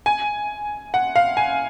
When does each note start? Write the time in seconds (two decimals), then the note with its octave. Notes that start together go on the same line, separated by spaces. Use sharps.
0.06 G#5
0.94 F#5
1.16 F5
1.37 G#5